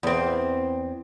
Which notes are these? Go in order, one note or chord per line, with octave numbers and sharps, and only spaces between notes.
E2 C4